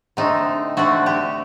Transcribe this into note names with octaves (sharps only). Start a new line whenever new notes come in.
D3 A3 C4 D#4
D3 A3 C4 F#4
G4